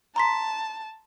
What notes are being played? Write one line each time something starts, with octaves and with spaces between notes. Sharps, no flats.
A5 A#5 C6 B6